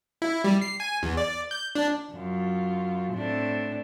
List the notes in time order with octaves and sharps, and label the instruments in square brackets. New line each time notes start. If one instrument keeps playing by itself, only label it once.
[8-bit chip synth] E4
G3
C7
G#5
E2
D5
G6
D4
[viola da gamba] F#2 F4
A2 C4 D4